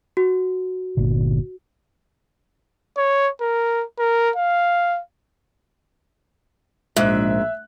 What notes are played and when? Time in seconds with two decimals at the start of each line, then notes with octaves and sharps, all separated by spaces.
0.17 F#4
0.97 G1 A#2 D3
2.97 C#5
3.41 A#4
3.99 A#4
4.36 F5
6.96 A#1 G#2 E5 F#6